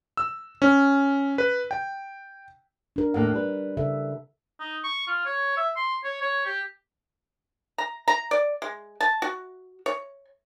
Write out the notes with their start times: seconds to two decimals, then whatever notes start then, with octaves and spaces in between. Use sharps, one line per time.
0.17 E6
0.62 C#4
1.38 B4
1.71 G5
2.96 D4 A#4
3.14 D#2 A2 A#3 F#5
3.34 G3 B4
3.77 C#3 A4 E5
4.60 D#4
4.84 C#6
5.07 F4
5.26 C#5
5.57 E5
5.76 C6
6.04 C#5
6.21 C#5
6.46 G4
7.78 A#5
8.08 A#5
8.31 D5
8.62 G#3
9.00 A5
9.22 F#4
9.86 C#5